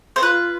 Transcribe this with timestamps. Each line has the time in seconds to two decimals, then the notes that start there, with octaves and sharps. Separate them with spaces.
0.16 C5
0.22 F4 B4